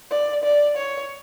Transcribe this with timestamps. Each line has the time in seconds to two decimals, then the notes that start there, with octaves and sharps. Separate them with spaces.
0.11 D5
0.44 D5
0.77 C#5